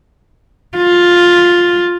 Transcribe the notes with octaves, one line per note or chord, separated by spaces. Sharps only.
F4